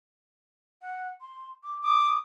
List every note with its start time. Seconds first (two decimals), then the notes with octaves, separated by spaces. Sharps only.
0.82 F#5
1.21 C6
1.63 D6
1.83 D6 D#6